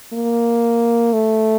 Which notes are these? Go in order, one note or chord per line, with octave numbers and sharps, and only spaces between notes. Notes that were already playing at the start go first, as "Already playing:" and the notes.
A#3
A3